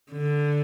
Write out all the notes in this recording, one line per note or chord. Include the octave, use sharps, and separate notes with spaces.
D3